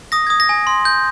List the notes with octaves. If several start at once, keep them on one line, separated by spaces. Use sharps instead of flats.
D#6 A#6
D#6 G#6
A#6
G#5
C6
G6